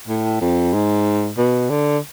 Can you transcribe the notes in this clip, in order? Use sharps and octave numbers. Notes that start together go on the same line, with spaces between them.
A2
F2
G#2
B2
D3